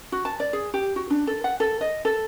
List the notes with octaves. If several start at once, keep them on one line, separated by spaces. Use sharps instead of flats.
F#4
A5
D5
G#4
G4
F#4
D4
A4
F#5
A4
D#5
A4